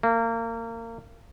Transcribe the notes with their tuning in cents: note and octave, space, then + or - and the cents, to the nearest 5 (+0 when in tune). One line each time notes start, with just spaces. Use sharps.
A#3 -30